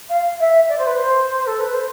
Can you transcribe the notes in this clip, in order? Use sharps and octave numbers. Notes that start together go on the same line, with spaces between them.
F5
E5
D5
C5
B4
C5
A4
B4
C5